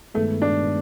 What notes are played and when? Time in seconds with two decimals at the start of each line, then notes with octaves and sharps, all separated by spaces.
0.14 G2 D#3 G#3 A3 B3
0.42 D4